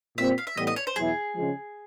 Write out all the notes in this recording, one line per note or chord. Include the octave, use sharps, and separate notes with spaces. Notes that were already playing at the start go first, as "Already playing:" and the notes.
A#2 G3 C4 E5
F5
E5
A2 E3 G3 B3 D#5
D#5
C#5
C5
E2 B2 F#3 B3 E4 G#4
C#3 F3 G#3